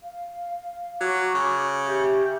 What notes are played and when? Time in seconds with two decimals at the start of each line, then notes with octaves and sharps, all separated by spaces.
0.03 F5
1.01 F#3 C#6 D6
1.35 C#3
1.86 G4 E5 G6